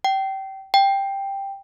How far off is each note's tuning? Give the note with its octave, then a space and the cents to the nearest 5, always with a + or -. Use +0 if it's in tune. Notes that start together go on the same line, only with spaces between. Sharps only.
G5 -25
G5 +5